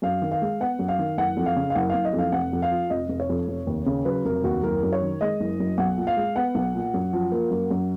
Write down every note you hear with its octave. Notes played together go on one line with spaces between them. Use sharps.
F#2 F5
D#3
F5
G#3
B3 F#5
F#2
F5
D#3
F#1 F#5
F2
F5
C#3
F5
F#1 F#5
F5
F#1
D#5
F2
F5
F1 F#5
F2
F5
F3
F1 D#5
F1
C#5
F2
F1
D#2
C#3
F#3 B4
F1 A#4
D#2 F#4
F#1 A#4
F#2
C#5
D#3
G#3 D#5
F#1
F#2
B1 F#5
A#2
F5
G#3
B3 F#5
B1
A#2
F#2
F3
A#3
F#2
F#2